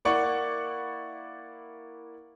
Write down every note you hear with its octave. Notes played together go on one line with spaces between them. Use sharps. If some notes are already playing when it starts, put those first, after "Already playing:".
A#3 E4 D5 F#5 C#6 D6